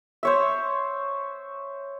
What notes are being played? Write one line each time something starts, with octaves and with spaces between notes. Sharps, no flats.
C5 C#5 E5